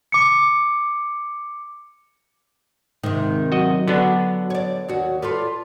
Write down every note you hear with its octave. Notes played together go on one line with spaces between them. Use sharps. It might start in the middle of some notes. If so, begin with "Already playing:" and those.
D6 C#7
G#2 C3 D#3
F#3 F#4 D#5
D3 B3 D4 F#4
C#5 D5
D#2 F#4
F4 A4 B4 D5